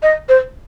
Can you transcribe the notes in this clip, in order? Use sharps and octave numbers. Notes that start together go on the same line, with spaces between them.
D#5
C5